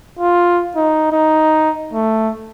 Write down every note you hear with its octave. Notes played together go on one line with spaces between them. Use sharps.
F4
D#4
D#4
A3